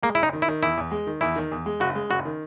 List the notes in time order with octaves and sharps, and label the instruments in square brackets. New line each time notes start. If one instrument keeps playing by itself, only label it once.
[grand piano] G#3 [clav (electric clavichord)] A#3
[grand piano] F#1 [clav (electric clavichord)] E4
[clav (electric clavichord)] D#4
[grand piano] D#3
[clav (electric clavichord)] E4
[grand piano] D#3
[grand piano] E2 [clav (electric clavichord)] E4
[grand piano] E2
G#3
D#3
[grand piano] E2 [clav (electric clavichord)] E4
[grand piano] D#3
E2
G#3
[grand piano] F#1 [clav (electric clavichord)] F#4
[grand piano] G#3
[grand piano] F#1 [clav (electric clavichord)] F#4
[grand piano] D#3